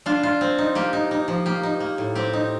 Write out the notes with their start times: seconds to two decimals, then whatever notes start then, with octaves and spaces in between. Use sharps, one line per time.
0.06 D4 F4
0.23 F4
0.41 C4
0.58 D#4
0.75 A#3 G4
0.93 D#4
1.11 D#4
1.28 F3
1.46 A#3 G4
1.63 D#4
1.80 A#3
1.98 A2
2.15 C4 G4
2.33 D#4